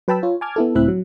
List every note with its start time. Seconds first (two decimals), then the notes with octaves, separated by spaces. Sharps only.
0.08 F#3 B4 G5 A5 B5 E6
0.23 F4 C#5
0.41 G#5 A5 D6 F6 G#6
0.56 B3 E4 A4
0.75 C#2 A2 C4 E4 E5 F#6
0.88 F#3